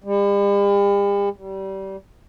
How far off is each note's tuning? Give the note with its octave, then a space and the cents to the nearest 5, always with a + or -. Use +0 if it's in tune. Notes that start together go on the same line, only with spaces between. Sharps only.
G3 +45
G3 -25